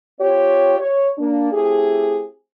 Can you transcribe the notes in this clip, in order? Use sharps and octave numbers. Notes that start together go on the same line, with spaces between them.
C4 F4 G4 C#5
C#5
A#3 D4
A3 C4 E4 G4 G#4